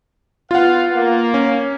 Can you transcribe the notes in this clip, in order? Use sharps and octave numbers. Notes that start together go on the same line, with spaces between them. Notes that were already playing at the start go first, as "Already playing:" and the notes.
B3 F4 B4 F5 F#5
A#3
C#4